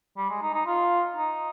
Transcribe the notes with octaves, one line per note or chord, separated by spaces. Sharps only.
G3
G#3
D#4
D#4
F4
D#4